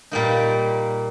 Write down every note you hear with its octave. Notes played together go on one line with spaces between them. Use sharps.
A#2 G3 A#3 D#4